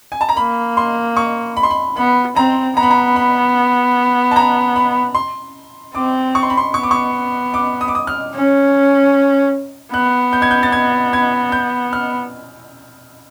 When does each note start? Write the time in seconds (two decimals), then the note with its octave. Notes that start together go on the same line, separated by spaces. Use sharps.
0.12 G#5
0.21 A5
0.29 A#5
0.37 A#3 B5
0.77 C6
1.17 C#6
1.57 B5
1.63 C6
1.70 B5
1.97 B3 B5
2.36 C4 A#5
2.76 B3 A#5
2.83 B5
2.90 A#5
3.16 B5
4.31 A5
4.36 A#5
4.76 B5
5.15 C6
5.95 C4 D6
6.35 C#6
6.43 C6
6.50 B5
6.57 C6
6.74 B3 C#6
6.83 D6
6.91 C#6
7.54 D6
7.81 D#6
7.88 D6
7.95 D#6
8.07 F6
8.34 C#4
9.93 B3 F#6
10.33 G6
10.42 G#6
10.51 G6
10.63 A6
10.72 G#6
11.13 G#6
11.52 G6
11.93 F6